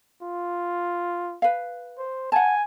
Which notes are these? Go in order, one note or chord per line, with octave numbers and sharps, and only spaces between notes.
F4
B4 F5
C5
F#5 G#5 A5